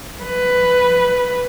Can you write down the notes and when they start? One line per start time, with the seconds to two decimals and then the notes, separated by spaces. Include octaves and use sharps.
0.24 B4